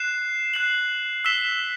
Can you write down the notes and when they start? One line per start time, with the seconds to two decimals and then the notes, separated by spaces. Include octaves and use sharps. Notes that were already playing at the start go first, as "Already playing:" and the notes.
Already playing: F#6 C7 E7
0.54 F#6 C7 F#7
1.25 E6 B6 E7 G7